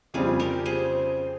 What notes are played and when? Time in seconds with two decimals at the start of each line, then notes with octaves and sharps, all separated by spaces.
0.14 F2 C#3 G3 C4 F4 G#4
0.39 G4 A#4
0.65 G#4 C5